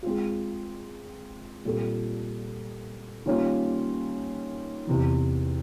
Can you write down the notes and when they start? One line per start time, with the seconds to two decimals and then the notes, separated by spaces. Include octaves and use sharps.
0.03 G#3 C4 F4
1.65 A#2 G3 C4 F4 A4
3.26 D#3 G3 A#3 C#4 F4
4.87 E2 C3 E3